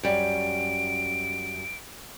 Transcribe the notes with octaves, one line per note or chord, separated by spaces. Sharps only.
F#2 G3 D7